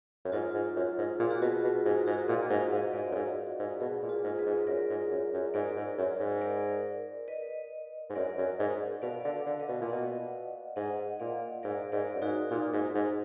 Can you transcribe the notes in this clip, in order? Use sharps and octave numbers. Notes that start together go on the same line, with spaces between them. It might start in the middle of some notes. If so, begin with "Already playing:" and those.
F#2
G#2 F4
G#2
F#2
G#2
A#2 G#4
F#4
B2 F4 G#4
B2
G#2
G#2 F#4 A#4
A#2 D#5 F#5
G#2 D5 F5
G#2 B4 D#5
G#2 A#4 D5
F#2
G#2
G#2
B2 G#4 B4
A#2
F4 G#4
G#2
G#4 B4
G#2
B4
F#2 A#4 D5
G#2
F#2
F#2
G#2 A#4 D5
G#2
F#2
G#2
A#4 D5
B4 D#5
G#2
F#2 A#4 D5
F#2
G#2
B2 D5 F5
D3
D5 F5
D3
B4 D#5
B2
A#2
B2 D#5 F#5
G#2 D#5 F#5
A#2 D5 F5
G#2 A#4 D5
G#2 A#4 D5
F#2
G#2 D#4 F#4
A#2 D#4
G#2
G#2